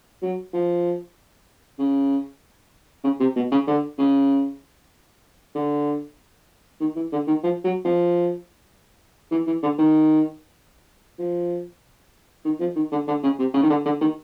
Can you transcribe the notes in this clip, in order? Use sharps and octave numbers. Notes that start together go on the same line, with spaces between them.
F#3
F3
C#3
C#3
C3
B2
C#3
D3
C#3
D3
D#3
E3
D3
D#3
F3
F#3
F3
E3
E3
D3
D#3
F3
D#3
F3
D#3
D3
D3
C#3
C3
C#3
D#3
D3
D3
D#3